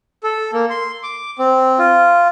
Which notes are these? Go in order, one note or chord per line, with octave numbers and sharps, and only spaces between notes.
A4
A#3
C6
D6
C4
F4